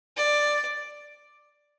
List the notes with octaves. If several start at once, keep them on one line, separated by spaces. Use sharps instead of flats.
D5